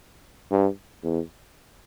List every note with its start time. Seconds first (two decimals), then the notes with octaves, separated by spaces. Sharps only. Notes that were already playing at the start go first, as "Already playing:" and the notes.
0.51 G2
1.03 E2